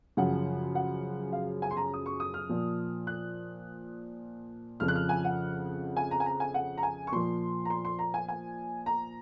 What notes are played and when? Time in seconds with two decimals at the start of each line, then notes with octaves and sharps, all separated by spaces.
0.17 F#2 C#3 F3 F#5
0.75 F#5
1.33 F5
1.62 G#5
1.71 C6
1.77 A#5
1.94 D#6
2.06 C#6
2.20 D#6
2.34 F6
2.49 A#2 F3
3.07 F#6
4.80 F2 C#3 F3 F6
4.88 F#6
4.96 F6
5.09 G#5
5.25 F#5
5.97 G#5
6.11 A#5
6.20 G#5
6.26 A#5
6.40 G#5
6.54 F#5
6.78 A#5
6.83 G#5
7.07 C#6
7.12 A#2 F3 C6
7.65 A#5
7.70 C6
7.85 C6
7.99 A#5
8.14 G#5
8.29 G#5
8.86 A#5